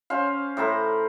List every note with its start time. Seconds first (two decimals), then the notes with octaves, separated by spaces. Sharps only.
0.10 C#4 C5 F5
0.57 A2 C5 A#5 B5